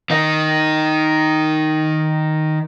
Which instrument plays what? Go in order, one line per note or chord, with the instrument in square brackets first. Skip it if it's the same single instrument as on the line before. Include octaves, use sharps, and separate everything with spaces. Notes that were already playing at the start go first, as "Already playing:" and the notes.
[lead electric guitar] D#3 D#4